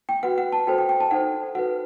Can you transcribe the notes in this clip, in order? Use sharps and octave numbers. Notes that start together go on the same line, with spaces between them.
G5
F#4 B4 F#5
F#5
A5
F#4 A4 C5 G5
G5
G5
A5
D#4 A4 C5 F#5
F#4 B4 F#5